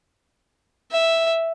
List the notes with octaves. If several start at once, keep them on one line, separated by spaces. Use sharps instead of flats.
E5